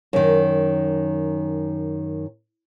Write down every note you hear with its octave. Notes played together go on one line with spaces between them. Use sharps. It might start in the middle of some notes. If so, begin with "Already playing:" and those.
F#2 D#3